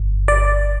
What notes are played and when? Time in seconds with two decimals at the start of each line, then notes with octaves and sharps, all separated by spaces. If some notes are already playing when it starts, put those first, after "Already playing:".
Already playing: G1
0.28 D5